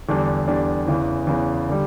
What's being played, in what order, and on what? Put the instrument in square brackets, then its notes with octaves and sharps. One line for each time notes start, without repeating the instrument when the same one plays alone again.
[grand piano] E2 D3 G3 D4
E2 D3 G3 D4
E2 C#3 E3
E2 C#3 E3
D3 G3